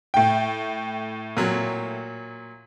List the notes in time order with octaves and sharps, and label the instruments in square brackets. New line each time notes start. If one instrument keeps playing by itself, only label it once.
[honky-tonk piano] A2 G5
[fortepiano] A#2 F#3